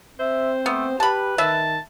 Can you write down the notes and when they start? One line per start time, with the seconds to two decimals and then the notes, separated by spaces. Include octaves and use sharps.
0.19 C4 C5 E5
0.66 A3 B3
1.00 G4 B4 A5 B5
1.38 D#3 E5 A5